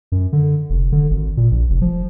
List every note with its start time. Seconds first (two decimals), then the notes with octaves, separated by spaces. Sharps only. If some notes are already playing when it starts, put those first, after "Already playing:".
0.12 F#2
0.33 D3
0.70 F1
0.92 D3
1.11 G#1
1.37 A#2
1.52 A#1
1.70 F1
1.82 F3